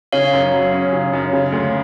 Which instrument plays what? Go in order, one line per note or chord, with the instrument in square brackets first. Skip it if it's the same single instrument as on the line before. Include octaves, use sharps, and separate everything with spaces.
[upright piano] C#3 [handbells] C#5 F5
[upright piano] F#2
F#3
C#4
C#3
F#2
C#3
D2